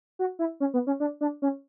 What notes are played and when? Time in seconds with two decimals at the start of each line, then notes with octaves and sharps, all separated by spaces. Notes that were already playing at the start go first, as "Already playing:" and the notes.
0.19 F#4
0.39 E4
0.60 C#4
0.74 B3
0.87 C#4
1.00 D4
1.21 D4
1.42 C#4